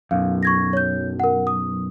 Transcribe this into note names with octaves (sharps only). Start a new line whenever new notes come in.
B1 F#2 F5
C#6 G#6 A#6
C#5 G6
A#4 F#5
D#6